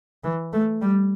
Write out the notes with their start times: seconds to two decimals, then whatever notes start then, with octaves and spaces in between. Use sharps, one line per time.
0.24 E3
0.53 A3
0.81 G3